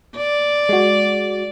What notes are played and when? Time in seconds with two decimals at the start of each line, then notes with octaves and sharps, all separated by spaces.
0.16 D5
0.69 G#3 F#4